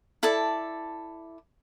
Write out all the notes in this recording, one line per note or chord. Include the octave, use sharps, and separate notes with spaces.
E4 A4 D5 A5